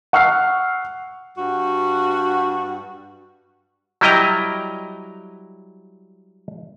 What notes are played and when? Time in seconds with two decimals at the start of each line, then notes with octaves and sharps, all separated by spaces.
0.13 F#5 C#6 E6 F6 C7
1.37 G2 F#4
4.01 F#3 G3 E4 D#5 G5 A#5